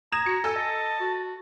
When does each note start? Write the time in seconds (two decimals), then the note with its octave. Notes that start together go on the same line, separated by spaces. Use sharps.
0.12 A#5 D#6 G#6 E7
0.26 F#4 C#7
0.44 A4 G#5 E6
0.56 D#5 A5
1.00 F#4